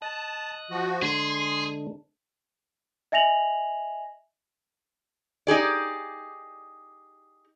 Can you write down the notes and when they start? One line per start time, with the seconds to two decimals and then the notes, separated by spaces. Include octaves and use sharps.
0.02 D#5 A5 D#6 F#6
0.71 F3 F#4
1.02 D3 G#3 D4 G#4 C6
3.12 D#5 E5 G#5 A#6 F7 F#7
5.47 D#4 G4 G#4 D5